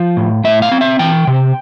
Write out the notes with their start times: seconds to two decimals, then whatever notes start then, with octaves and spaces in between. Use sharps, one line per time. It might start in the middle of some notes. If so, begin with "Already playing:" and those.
Already playing: F3 F5
0.17 A2
0.44 A2 E5
0.62 F5
0.72 C4
0.81 E5
0.99 E3 G5
1.27 C3